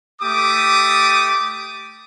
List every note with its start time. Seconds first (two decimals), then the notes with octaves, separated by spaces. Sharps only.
0.21 A3 G4 D6 D#6